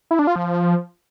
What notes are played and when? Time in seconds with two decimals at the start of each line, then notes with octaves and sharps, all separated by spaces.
0.11 E4
0.19 D4
0.27 F4
0.36 F3